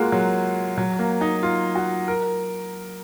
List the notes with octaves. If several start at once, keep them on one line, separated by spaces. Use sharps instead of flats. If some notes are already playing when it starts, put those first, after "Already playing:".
Already playing: G#3 A#3 F4 F#4
F#3
F#3
A#3
D#4
F4
F#4
A#4